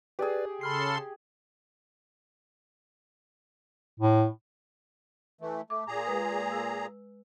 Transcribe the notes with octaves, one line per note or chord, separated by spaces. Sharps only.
G4 G#4 B4 D5
C#3 A4 B5 C6 F6 C7
A2
E3 A3
A3 D6
A#2 G#4 A#5
G#3 B4 D#6
E6